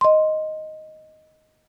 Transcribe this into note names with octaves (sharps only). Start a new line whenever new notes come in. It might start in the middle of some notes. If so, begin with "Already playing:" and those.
D#5 C6